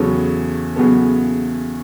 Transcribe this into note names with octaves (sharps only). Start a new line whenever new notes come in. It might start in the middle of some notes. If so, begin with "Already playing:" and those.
Already playing: E2 C#3 F#3 B3 A4
E2 C#3 F#3 B3 A4